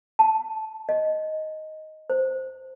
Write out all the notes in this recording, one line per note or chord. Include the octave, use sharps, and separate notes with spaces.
A5
D#5
C5